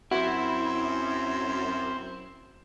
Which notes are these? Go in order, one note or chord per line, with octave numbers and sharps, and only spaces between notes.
F#2 C4 E4 F#4